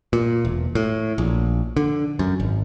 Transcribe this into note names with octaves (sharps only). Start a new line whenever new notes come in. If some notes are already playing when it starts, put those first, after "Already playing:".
A#2
E1
A2
A#1
D3
F#2
G#1